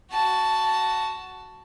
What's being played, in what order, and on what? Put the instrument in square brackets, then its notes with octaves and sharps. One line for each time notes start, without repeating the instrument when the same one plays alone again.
[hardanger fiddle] F#4 A5